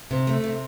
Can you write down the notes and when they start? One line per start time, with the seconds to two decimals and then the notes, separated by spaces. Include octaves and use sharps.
0.11 C3
0.27 A3
0.44 C3